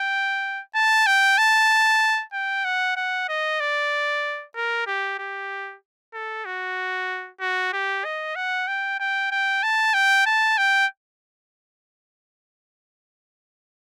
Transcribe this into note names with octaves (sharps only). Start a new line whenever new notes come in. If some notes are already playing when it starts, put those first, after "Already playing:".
Already playing: G5
A5
G5
A5
G5
F#5
F#5
D#5
D5
A#4
G4
G4
A4
F#4
F#4
G4
D#5
F#5
G5
G5
G5
A5
G5
A5
G5